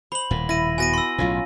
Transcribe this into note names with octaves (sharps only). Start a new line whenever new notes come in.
C5 B5 F#7
D#1 A2
E4 A#6 D#7
B3 F#4 G#5 A#6 D#7
C6 E6
B1 A2 C#4 F4 A#5